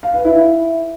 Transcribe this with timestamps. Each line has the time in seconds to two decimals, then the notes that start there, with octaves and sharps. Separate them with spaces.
0.03 F5
0.14 B4
0.25 E4